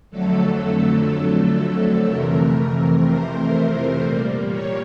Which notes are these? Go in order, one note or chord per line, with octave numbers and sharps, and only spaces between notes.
F2 D3 F#3 A3 A4
A4
F2 C3 E3 A3 A#4
C5
A#2 G3 A#3
C#5